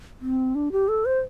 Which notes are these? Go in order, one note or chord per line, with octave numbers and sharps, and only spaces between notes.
C4
D4
G4
A4
C5